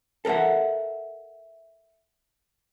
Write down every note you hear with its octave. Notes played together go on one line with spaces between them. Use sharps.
A4 A#4 C5 E5 F#5